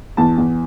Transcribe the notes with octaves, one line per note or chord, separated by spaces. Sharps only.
E2 A5
E2